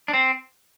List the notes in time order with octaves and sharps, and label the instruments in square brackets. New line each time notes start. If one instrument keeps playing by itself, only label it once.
[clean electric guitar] D4
C4